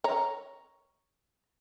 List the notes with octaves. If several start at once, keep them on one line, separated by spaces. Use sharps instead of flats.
C#5 A#5